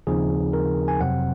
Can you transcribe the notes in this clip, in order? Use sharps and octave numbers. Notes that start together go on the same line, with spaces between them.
D#2 C#3 F3 C4 D#4 G#4
A#4
G#5
F2 C3 F#3 C4 F#5